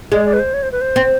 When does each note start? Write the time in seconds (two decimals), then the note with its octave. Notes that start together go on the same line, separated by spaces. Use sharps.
0.12 G#3 D5
0.25 D5
0.33 B4
0.39 C5
0.54 C#5
0.63 C5
0.72 B4
0.81 C5
0.96 C4